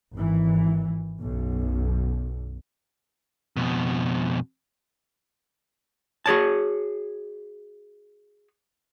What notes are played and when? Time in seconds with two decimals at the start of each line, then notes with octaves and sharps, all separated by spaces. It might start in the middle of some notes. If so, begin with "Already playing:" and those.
0.15 G#1 E3
1.20 B1 F#2
3.57 F2 B2
6.26 F#4 G#4 C#5 A5